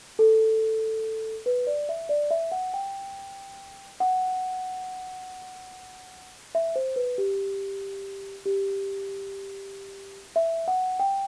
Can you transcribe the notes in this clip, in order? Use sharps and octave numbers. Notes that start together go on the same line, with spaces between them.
A4
B4
D5
E5
D5
E5
F#5
G5
F#5
E5
C5
B4
G4
G4
E5
F#5
G5